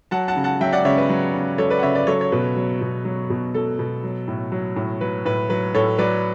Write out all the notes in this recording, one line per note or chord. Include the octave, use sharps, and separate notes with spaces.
F#3 F#5 A5
F#5 A5
C#3
F#5 A5
F#3 E5 G5
D5 F#5
C#3 C#5 E5
B4
F#3
C#3
F#3 A4 C#5
B4 D5
F#5
C#3 C#5 E5
B4 D5
F#3 A4 C#5
C#5
B2 B4
F#3
B2
F#3
B2
F#3 A4
B2
F#3
A2
F#3
A2
F#3 B4
A2 B4
F#3 B4
A2 A4 C#5
F#3 B4 D5